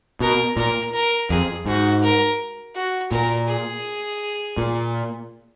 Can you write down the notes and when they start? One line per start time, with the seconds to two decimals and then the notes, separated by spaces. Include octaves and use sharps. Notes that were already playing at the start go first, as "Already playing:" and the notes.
0.20 B2 A#4
0.57 A#2 A#4
0.94 A#4
1.30 F2 G#4
1.66 G#2 F#4
2.03 A#4
2.75 F#4
3.12 A#2 A#4
3.48 G#4
4.57 A#2